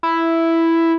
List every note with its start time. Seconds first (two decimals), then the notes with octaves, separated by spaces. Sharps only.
0.03 E4